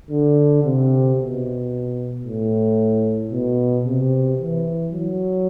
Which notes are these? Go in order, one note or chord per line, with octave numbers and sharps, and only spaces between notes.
D3
C3
B2
A2
B2
C3
E3
F#3